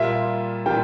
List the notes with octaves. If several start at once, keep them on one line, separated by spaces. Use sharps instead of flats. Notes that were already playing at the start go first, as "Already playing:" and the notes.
Already playing: A#2 G3 A#3 F4 E5
A#2 G3 A#3 F4 G5